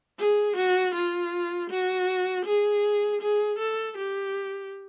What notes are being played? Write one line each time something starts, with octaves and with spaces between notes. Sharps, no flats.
G#4
F#4
F4
F#4
G#4
G#4
A4
G4